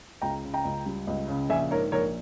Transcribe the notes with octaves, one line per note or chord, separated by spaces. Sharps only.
C#2 G5 A#5
C#3
G5 A#5
C#2
G3
C#2
C#3
A#1 E5 G#5
G#2 A#4 C#5
A#1 A#4 C#5